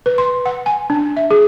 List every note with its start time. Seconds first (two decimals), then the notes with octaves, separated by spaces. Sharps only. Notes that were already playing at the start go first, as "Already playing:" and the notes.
0.06 B4
0.18 C6
0.46 F#5
0.66 G#5
0.90 D4
1.17 E5
1.31 G#4